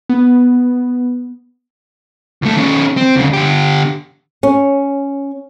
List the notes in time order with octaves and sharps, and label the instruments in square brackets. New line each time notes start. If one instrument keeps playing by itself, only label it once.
[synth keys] B3
[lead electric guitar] C#2 A3
D#3 C#4
C4
D2 C#3
D3 G4
[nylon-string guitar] C#4